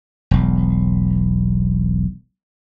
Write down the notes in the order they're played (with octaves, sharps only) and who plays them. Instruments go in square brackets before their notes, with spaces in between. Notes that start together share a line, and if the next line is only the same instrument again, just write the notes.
[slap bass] E1 B1